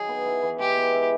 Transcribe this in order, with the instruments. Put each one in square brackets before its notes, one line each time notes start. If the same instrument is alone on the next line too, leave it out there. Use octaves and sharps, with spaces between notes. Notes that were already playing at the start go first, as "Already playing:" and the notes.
Already playing: [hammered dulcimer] D#3 F#3 D#4 [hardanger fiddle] G#4
[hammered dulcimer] B3
E4
E3
[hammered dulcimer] G#3 [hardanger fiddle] G4
[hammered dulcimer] B3
E4